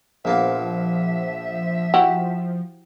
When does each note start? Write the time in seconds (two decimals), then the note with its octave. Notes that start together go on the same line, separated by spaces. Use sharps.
0.25 A#1 F3 A#3 B3 E5
1.94 E4 F#4 G4